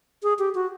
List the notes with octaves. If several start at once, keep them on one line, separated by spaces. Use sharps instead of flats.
G#4
G4
F#4